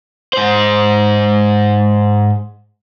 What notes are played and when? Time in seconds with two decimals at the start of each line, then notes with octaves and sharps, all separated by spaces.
0.33 G#2 C5